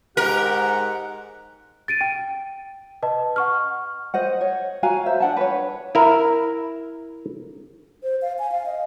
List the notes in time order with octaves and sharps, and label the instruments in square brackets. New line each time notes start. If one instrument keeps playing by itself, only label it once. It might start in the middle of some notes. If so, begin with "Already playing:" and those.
[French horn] G#2 [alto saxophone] G4 [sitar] A#4 [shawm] F#5
[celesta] A6 D7 D#7
G5
B4 D#5 A5
F#5 C#6 F6
[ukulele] C5 D#5 F#5
C#5
F#4 F5 G#5 A#5
C5 E5
D4 F#5 A5
B4 C#5
[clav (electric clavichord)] E4 A#4
[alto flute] C5
F5
G#5
F5
D#5